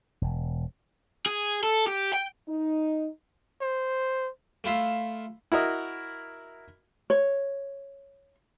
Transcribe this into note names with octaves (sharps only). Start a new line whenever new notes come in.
E1
G#4
A4
G4
G5
D#4
C5
A3 E4 F4 E5 F5
E4 F#4 A#4 D#5
C#5